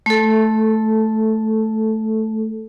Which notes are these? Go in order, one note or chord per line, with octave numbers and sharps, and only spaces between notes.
A3 A4